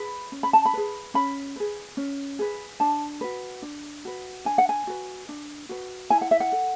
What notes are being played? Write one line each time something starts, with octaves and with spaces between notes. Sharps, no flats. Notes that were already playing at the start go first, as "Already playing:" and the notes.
Already playing: G#4 B4 B5
C#4
B5
A5
B5
G#4 B4
C#4 B5
G#4 B4
C#4
G#4 B4
D4 A5
F#4 B4
D4
F#4 B4
D4 G#5
F#5
G#5
F#4 B4
D4
F#4 B4
E4 G#5
F#5
E5
F#5
A4